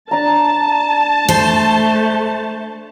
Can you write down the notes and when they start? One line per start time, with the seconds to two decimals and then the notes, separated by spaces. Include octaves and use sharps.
0.11 D4 A5 A#5
1.29 A3 C5